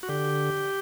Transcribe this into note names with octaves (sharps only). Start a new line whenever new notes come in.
F#4
D3 G4